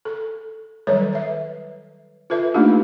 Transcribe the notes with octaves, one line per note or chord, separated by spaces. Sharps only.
A4
D#3 F#3 G3 A4 B4 C#5
B4 E5
F4 A4 B4 E5
A3 A#3 D4 D#4 F4 G4